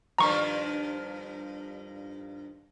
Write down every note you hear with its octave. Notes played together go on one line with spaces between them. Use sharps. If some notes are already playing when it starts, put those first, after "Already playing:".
G2 D#3 F3 A#5 C#6